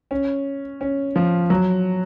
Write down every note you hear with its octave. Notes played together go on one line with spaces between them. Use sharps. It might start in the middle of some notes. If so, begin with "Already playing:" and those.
C#4
C#4
F3
F#3